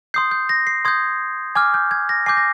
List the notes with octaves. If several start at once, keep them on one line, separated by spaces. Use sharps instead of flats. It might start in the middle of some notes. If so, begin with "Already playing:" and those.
C6 D#6 G6 C7
G6
A#6
C7
C6 D#6 G6 G#6
G#5 D6 F6 G#6
G6
G#6
A#6
G#5 D6 G6 C7
A#6